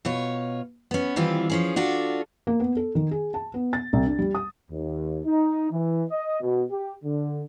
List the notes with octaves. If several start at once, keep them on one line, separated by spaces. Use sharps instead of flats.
B2 F4 C#5
B3 C#4
D#3 E3 G3 C4 F4
F3 C#4 G#4
D4 F4 F#4 A4
A#3
B3
A4
D#3
G#4
A5
B3
A6
C2
D4
G3
D#6
D#2
D#4
E3
D#5
B2
G4
D3